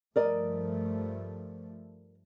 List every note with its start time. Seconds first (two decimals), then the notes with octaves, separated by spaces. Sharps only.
0.16 G2 F3 A3 A#4 D5 D#5